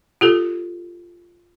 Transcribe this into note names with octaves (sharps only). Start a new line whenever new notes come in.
F4 G4 A4